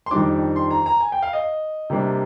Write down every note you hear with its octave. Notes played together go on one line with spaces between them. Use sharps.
C6
F2 D#3 G3 D4 D6
C6
A#5
A#5
G#5
G5
F5
D#5
C3 G3 A#3 D4